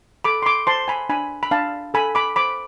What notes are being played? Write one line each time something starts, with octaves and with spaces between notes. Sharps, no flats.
A4 B5 D6
C6
B5 D6
C5 A5 C6
G#5 B5
D4 G#5 B5
B5
D4 F5 A5
A4 G#5 B5
B5 D6
C5 B5 D6